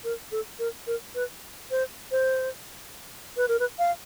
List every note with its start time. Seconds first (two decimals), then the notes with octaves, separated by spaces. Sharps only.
0.04 A#4
0.32 A4
0.59 A#4
0.87 A#4
1.15 B4
1.71 C5
2.11 C5
3.37 B4
3.48 A#4
3.59 B4
3.79 F5